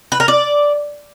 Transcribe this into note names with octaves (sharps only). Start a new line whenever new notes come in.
B4
A#4
D5